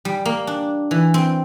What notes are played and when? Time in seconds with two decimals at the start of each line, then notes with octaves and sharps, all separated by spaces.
0.05 G3
0.25 A#3
0.47 D4
0.91 E3
1.14 C4